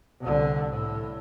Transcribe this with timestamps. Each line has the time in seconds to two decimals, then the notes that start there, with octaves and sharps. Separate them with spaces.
0.20 C2 D3
0.71 A2